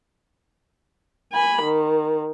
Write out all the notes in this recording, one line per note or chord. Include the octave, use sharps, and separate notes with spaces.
G#5 B5
D#3